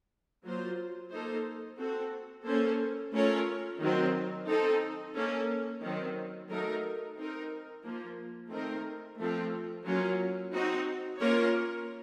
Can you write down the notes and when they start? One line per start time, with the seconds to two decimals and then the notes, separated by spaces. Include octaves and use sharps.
0.44 F#3 A#3 F4 C5
1.12 A#3 D#4 A4 C5
1.78 C4 F#4 A4
2.46 A#3 C#4 A4 C5
3.13 A3 C#4 F4 A#4 C#5
3.80 D#3 F#3 C4
4.47 C4 D#4 A4
5.15 A#3 C#4 A4
5.82 D#3 F#3 C4
6.49 F#3 A3 D#4 A#4
7.17 C4 D#4 A#4
7.84 F3 A#3 F4
8.50 D#3 A3 C4 D#4 A#4
9.19 F3 A3 C4 F4
9.85 F#3 A#3 C#4 F4
10.53 C4 D#4 F#4
11.19 A#3 C#4 F4 A#4 C#5